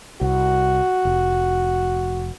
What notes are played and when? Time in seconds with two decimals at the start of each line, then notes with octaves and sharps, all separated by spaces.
0.21 C2 F#4
1.05 F1